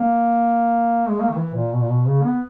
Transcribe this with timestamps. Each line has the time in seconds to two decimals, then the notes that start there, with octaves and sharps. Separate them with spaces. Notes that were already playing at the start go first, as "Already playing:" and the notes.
Already playing: A#3
1.08 G#3
1.20 A#3
1.30 D#3
1.37 E3
1.54 A#2
1.72 B2
1.81 A#2
1.89 B2
2.07 C#3
2.24 B3